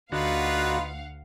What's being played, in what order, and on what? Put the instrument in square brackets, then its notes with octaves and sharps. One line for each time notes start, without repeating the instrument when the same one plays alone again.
[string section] D2 F5 F#5 [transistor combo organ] D3 F#4 [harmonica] D#4 F4 B4